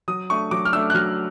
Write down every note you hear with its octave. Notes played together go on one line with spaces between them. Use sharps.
F#3 D#6
A3 D4 C#6
F#3 D6
F6
A3 D4 E6
F#6
F#3 F6